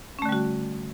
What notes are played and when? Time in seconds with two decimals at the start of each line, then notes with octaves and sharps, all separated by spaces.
0.19 C#4
0.22 A3
0.26 D3
0.29 G3
0.32 F#4